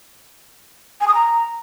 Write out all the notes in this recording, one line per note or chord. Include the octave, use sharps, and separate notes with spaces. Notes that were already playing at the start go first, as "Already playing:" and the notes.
G#5
D#6
A#5